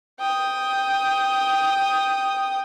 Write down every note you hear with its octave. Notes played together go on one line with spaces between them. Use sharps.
G5 D#6